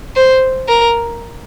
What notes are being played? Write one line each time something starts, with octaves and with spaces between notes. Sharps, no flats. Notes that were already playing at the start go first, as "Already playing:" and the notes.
C5
A#4